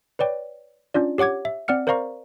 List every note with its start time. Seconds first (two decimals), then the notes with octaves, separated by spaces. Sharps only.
0.19 B4 C#5 D5 G5
0.94 C#4 D4 F4 D5
1.18 G4 C#5 F#5 D6 G#6
1.45 E5
1.68 C4 D5 F#5 F6 C#7
1.87 A#4 C5 D5 F5 A#5 C#6